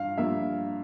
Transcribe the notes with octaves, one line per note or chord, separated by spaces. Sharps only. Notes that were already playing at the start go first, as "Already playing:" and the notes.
Already playing: G2 F5
G2 F3 A#3 E5